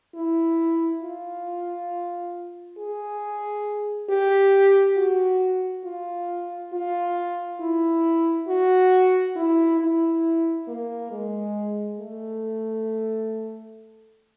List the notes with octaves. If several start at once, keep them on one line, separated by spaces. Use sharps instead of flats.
E4
F4
G#4
G4
F#4
F4
F4
E4
F#4
E4
E4
A#3
G#3
A3